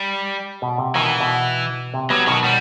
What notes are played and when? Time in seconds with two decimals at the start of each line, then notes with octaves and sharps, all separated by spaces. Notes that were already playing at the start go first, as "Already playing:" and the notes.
Already playing: G3
0.62 B2
0.78 C3
0.95 B2 D#3 E3
1.21 B2
1.94 C3
2.10 F#3 G3 B3
2.27 B2 D#3 F#3
2.44 G3